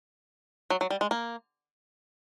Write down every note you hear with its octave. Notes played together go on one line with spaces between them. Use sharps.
F#3
F#3
G3
G#3
A#3